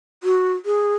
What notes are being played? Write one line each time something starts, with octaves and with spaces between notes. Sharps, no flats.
F#4
G#4